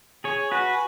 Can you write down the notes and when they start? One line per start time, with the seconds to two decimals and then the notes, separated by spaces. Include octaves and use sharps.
0.24 G#4 C#5 G#5
0.51 F#4 B4